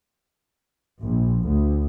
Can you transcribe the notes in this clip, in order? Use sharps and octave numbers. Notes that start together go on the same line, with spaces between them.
A#1
D2